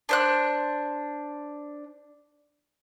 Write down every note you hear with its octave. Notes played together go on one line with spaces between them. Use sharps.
D4 C5 F#6